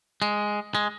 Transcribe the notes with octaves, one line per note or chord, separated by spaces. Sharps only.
G#3
G#3